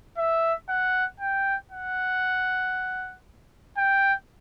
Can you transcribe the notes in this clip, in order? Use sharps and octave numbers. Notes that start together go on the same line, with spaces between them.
E5
F#5
G5
F#5
G5